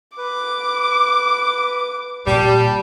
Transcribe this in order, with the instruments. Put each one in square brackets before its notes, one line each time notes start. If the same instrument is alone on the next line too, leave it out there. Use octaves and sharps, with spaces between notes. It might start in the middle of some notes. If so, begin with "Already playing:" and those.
[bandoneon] B4 [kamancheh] D6
[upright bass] A#2 [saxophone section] G3 [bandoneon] A5